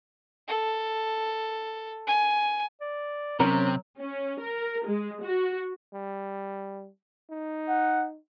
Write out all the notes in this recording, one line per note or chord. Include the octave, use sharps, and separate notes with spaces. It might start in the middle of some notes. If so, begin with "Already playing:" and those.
A4
G#5
D5
C3 F#3 C#4 A#4
C#4
A#4
G#3
F#4
G3
D#4
F#5